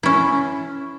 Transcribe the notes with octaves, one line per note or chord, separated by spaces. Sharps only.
C#4 E4